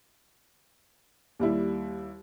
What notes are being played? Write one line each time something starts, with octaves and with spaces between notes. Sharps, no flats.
D#2 G3 E4